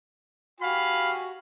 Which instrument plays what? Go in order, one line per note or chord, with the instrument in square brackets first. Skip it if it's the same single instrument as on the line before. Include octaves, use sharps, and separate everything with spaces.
[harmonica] F#4 G4 G#5 [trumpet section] F5 B5